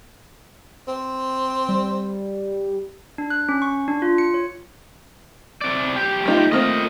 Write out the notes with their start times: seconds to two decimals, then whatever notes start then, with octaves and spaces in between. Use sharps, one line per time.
0.88 C4
1.69 G3
3.18 D4
3.30 F#6
3.49 C#4
3.62 C#6
3.88 D4
4.02 F4
4.18 C#7
4.34 C#5
5.61 C3 D5
5.96 B1 G4
6.26 A3 D#4 F4
6.52 A3 A#3 C4 F4 D#5